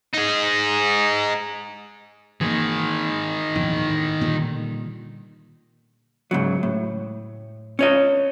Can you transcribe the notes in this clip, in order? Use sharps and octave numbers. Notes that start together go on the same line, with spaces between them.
D#4 G#4
D#3 E3 A#3 G#4
A#1 E2 G#2
A2
A#2 D3 G3
G#2 C#3 F#3
A2
C#4 C#5 D#5